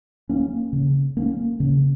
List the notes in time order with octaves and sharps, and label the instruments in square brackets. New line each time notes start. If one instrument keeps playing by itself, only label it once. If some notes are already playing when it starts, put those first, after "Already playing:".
[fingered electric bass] A#3 C#4
C#3
A#3 C#4
C#3